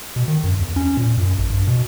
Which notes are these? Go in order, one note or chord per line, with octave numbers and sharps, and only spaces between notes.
B2
D#3
F#2
E2
C#4
A#2
F#2
A1
G2
B2